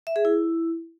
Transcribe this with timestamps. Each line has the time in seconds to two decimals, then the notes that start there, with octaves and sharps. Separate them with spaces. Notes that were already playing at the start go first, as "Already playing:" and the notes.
0.07 E5
0.16 G#4
0.25 E4